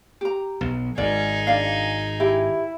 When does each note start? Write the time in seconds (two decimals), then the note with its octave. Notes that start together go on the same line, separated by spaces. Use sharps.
0.21 G4 A#5
0.61 B1
0.98 G#1 D#4 G#4 D5
1.47 D4 D5 F5
2.20 E4 G4